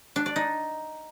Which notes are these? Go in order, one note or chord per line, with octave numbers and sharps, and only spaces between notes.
D4
D5
D#4